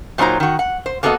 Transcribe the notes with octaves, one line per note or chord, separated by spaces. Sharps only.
A#2 F#3 D4 D#4 C5 A#5
D#3 F#4
F#5
C5
A#3 B3 F#4 A4 C#5 D#5